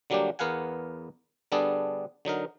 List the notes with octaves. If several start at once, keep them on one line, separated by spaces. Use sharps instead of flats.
D3 F#3 G3 A#3 D4 G4
E2 B3 A#4 F5 F#5 G#5
D3 G3 B3 D4 G#4 A4
D3 F#3 D#4 A#4